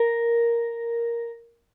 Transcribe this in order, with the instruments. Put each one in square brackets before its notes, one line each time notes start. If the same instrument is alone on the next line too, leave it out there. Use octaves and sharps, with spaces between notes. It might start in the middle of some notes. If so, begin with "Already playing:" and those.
Already playing: [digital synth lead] A#4